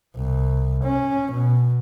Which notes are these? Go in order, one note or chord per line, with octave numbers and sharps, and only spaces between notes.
C2
C#4
B2